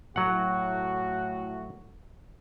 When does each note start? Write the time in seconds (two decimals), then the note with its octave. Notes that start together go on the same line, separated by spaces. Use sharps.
0.16 A2 F#3 F#4 F#5